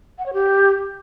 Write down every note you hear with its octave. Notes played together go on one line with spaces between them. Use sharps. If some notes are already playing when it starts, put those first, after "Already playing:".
F#5
C#5
G4